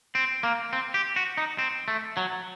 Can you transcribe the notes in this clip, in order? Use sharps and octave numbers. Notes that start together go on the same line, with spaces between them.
C4
A#3
C4
G4
F#4
D#4
C4
A3
F#3